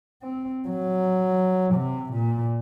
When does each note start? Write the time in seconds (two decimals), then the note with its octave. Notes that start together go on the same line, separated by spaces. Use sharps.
0.23 C4
0.68 F#3
1.75 C3
2.13 A#2